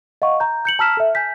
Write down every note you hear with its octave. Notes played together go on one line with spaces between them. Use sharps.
D#5 F5 F#5 C#6
A#5 G6
G6 C#7 F#7
A5 A#5 E6 F6 B6 E7
A4 E5
G#5 G6 B6